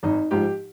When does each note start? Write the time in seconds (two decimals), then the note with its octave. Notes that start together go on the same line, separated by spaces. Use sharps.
0.03 G#1 D#4
0.31 G#2 F3 G4